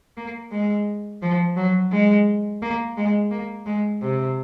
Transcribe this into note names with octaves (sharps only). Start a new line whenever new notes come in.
A#3
G#3
F3
F#3
G#3
A#3
G#3
A#3
G#3
C3